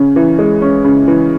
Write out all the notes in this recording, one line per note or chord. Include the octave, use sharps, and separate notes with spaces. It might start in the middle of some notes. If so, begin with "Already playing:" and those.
Already playing: C#3 C#4
E3
G#3
C#4
C#3
E3